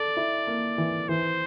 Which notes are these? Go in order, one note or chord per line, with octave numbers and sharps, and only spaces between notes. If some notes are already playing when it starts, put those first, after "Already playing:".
Already playing: A4 D5
E4
A#3
E3
E3 C5